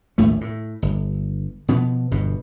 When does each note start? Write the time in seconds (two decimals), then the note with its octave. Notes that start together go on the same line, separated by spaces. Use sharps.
0.18 A#1 D#2 A2 A3
0.41 A2
0.82 G1
1.68 B2 F3 B3
2.11 G1 G2 B2